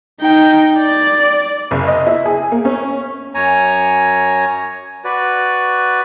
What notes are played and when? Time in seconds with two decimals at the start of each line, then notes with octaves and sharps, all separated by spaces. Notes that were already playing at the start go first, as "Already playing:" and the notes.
0.21 D#4 G5
0.79 D5
1.71 F#1
1.87 D#5
2.07 E4
2.25 G#4
2.52 A#3
2.65 C#4
3.35 F#2 C#5 G#5 A#5
5.05 F#4 B4 D5